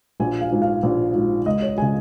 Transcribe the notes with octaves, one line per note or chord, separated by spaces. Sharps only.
A#1 G#5
F5
G#2 F3
F5
A#1
G#2 F3
C#2 D#5
C#5
C#3 G#3 G#5